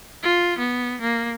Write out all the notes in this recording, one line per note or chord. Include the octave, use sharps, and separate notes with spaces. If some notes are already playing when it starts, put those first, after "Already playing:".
F4
B3
A#3